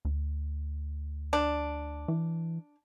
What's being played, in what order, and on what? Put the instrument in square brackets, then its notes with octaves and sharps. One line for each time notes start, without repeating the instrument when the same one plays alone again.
[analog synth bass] D2
[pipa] D4
[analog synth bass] E3